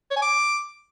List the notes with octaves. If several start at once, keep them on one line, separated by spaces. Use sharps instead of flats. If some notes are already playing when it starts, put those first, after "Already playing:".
C#5
G#5
D6